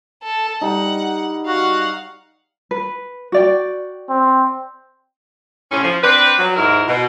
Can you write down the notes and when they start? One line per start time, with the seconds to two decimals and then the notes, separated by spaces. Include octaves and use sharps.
0.23 A4
0.61 G3 D#4 F#5
1.46 F#4 F5 F#5
2.71 B4
3.32 F#4 D5 G5
4.09 C4
5.72 A2 C3 C#4
5.83 F3
6.03 C4 D4 B4
6.39 F#3
6.56 D#2 G#2 E4 A#4
6.88 B2